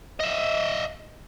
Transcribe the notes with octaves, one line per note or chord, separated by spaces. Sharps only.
D#5 E5